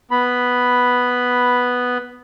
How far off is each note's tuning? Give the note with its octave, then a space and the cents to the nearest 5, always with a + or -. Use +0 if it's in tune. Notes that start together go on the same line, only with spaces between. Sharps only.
B3 +0 B5 +0